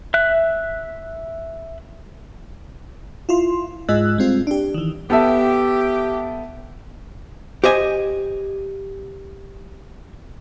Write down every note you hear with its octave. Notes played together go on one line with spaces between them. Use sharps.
E5 F#6
E4 F4 C6
G#2 G#3 F4 D#5 E6 F#6
G3 G#3 C4 F4
D4 G4
D#3 E3
B3 G4 A4 E5
G4 C5 D#5 G#5